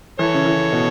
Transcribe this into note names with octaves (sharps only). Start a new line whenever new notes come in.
E3 A4 C#5
C#3
E3
B2